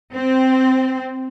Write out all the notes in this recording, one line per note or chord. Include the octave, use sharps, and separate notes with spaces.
C4